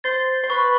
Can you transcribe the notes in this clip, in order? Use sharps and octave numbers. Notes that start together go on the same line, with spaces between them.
C5 A6
C5
B4 C#6